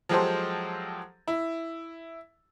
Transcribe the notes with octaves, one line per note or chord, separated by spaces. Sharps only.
F3 F#3 G#3 G4 A4 C5
E4